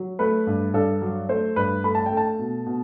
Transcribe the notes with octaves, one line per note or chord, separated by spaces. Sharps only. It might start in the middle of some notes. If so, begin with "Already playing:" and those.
Already playing: F#3
A3 B4
G2
G2 A4
F#3
A3 C5
G2 B4
A3 B5
A5
G5
A3
A5
B2
B2